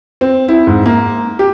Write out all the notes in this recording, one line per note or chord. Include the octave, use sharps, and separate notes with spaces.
C4
E4
G#2
A#3
G4